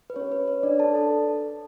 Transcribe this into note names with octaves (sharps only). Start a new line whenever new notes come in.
B4
C#4 G4 C#5
B4
C#5
D4 D5
D4 A4 A5
A4 A5